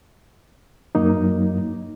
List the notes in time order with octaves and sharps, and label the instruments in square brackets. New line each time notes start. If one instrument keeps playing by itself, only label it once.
[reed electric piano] F#2 F#3 A#3 D#4